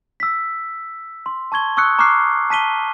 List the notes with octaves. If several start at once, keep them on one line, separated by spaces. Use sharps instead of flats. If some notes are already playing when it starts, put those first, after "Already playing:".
E6 B6
C6
A5 C#6 G#6 G7
C#6 D#6 E6 F#6 C#7
A#5 C#6 D6 F6 F#6 C7
A5 B6 D#7 G7